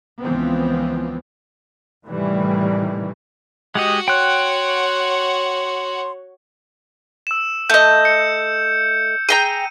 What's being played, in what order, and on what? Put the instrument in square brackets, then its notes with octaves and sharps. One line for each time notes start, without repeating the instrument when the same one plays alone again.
[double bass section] C#2 E3 F3 B3 C4
A2 C3 D#3 E3 G3
[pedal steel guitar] G#3 G4 D#5 [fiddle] F#4 F#5
[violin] C#5 [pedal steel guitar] G5 F#6 [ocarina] C6
[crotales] E6 E7
[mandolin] A3 D#5 [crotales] G6
[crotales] C#7
[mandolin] G#4 G5 A#5 [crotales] D#7